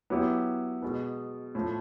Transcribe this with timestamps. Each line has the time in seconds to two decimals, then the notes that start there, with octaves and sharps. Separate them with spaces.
0.10 F#3 B3 E4 G4
0.82 B2 G#3 B3
1.55 A2 F3 A3